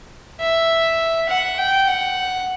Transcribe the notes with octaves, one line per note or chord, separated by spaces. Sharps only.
E5
F#5
G5
F#5